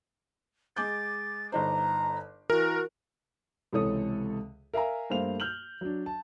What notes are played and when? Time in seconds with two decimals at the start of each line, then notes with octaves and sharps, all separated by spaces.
0.76 G#3 D6 G6 A6
1.52 G1 D#4 C5 A#5
2.50 E3 F#4 A#4
3.73 C#2 C3 E3 A4 C#5 D#6
4.74 A#4 E5 F5 G#5 A#5
5.10 G2 A3 A#3 C5 F5 F7
5.40 F6 G6 F7 F#7
5.81 F#3 D4
6.06 A5